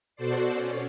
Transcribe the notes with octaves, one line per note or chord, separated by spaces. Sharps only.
B2 F#4 A4 C5 D5 C7
C#4